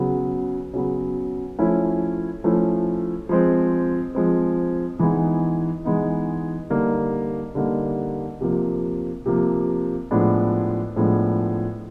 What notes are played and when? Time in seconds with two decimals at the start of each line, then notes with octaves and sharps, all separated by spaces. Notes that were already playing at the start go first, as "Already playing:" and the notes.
Already playing: C#3 F#3 B3
0.74 C#3 F#3 B3
1.59 F3 A3 C#4 E4
2.44 F3 A3 C#4 E4
3.29 F3 G#3 C4
4.15 F3 G#3 C4
4.99 E3 G#3 B3 D#4
5.85 E3 G#3 B3 D#4
6.70 D3 G3 A#3 D#4
7.55 D3 G3 A#3 D#4
8.41 C3 F3 A#3
9.26 C3 F3 A#3
10.11 A2 F3 G#3 B3 D4
10.96 A2 F3 G#3 B3 D4